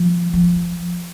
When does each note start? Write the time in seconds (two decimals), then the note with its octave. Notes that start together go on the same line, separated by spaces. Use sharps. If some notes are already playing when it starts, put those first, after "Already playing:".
Already playing: F3
0.33 F3